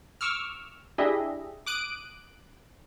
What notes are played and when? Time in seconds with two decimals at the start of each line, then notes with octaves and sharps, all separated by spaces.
0.21 C#6 D6 E6 F6
0.98 D4 E4 G4 G#4 D#5 E5
1.66 D6 D#6 F#6 D7